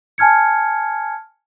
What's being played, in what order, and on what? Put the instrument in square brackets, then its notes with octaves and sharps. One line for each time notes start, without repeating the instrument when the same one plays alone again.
[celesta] G#5 A5 F6 G#6 C#7